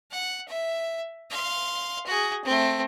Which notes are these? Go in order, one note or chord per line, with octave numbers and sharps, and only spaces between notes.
F#5
E5
F5 C6
F#4 G#4
A3 C4